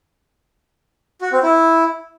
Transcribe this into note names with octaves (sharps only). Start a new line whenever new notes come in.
F#4
C4
E4